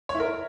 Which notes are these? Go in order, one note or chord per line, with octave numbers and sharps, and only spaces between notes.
C#5
E4
A#4